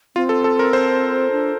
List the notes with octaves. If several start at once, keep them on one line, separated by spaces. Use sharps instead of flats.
C4 F4
A4
A4
A#4
C5
D4